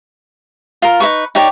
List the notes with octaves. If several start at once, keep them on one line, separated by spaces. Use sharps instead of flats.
F4 A#4
D#4 E4 B4 C#6
D#4 G4 C#5 D5